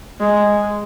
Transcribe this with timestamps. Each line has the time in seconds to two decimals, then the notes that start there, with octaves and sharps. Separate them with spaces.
0.20 G#3